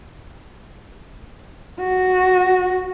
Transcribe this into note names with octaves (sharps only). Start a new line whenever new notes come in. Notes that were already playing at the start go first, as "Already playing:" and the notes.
F#4